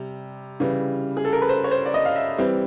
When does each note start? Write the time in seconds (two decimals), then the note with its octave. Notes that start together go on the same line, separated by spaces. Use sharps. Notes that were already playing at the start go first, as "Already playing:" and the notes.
Already playing: C3 G3
0.60 C#3 E3 G3
1.17 G#4
1.25 A4
1.33 A#4
1.42 B4
1.49 C5
1.64 C#5
1.71 C5
1.86 D5
1.94 D#5
2.05 F5
2.16 E5
2.38 E3 G3 C4